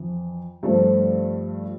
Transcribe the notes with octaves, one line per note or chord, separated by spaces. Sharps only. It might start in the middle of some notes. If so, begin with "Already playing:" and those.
Already playing: F2 E3
G2 F3 A3 C4